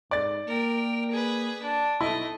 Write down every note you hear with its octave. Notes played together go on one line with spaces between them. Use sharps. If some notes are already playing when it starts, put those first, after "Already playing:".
G#2 D5 A6
A#3 A#4 G5
G#4 B4
D4
B1 A3 E4 D#5